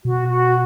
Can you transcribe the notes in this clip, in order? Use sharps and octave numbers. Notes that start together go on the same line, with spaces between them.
B2 F#4
F#4